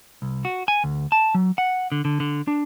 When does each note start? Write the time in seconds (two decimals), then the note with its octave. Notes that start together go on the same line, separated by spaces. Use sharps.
0.22 C2
0.45 F#4
0.68 G#5
0.84 D2
1.12 A5
1.35 F#3
1.58 F#5
1.92 D3
2.05 D3
2.20 D3
2.48 D4